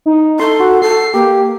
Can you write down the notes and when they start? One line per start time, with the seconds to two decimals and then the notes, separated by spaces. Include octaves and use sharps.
0.06 D#4
0.40 A4 C6
0.60 F#4
0.82 A4 C7
1.14 A#3 G4